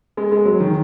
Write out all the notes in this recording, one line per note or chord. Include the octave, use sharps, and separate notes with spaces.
G#3
G#3
F#3
D#3